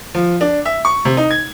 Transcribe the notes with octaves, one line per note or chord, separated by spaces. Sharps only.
F3
D4
E5
C#6
C3
D#4
G#6